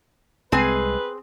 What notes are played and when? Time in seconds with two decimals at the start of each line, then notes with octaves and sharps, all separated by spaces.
0.52 C2 G#3 C4 G#4 B4 G#5